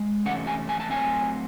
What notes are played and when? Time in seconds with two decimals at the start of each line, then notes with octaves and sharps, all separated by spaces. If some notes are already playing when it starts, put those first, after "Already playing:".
Already playing: G#3
0.25 C3 E3 A3 C#4 F#5
0.47 G#5
0.69 G#5
0.80 A5
0.90 A2 F#3 C4 G#5